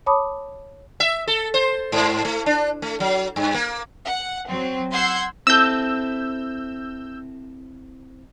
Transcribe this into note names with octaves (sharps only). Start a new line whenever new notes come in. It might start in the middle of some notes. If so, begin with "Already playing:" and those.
C#5 A5 B5 D6 D#6
E5
A4
C5
G#2
A3
D4
A3
F#3
G2
A#3
F#5
F#3 C4
F#5 C6 E6 G6 G#6 C7
C4 E4 A4 E6 G6